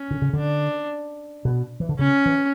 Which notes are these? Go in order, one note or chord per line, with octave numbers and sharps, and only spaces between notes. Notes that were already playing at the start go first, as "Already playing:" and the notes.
Already playing: C#4
D3
C#3
D3 D4
B2
E3
D3
C#3 C#4
E3